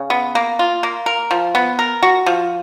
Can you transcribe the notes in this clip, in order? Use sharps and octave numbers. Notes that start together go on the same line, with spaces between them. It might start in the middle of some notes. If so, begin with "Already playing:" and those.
Already playing: C#3
B3
A#3
F4
A#3
A#4
F3
B3
A#4
F#4
F3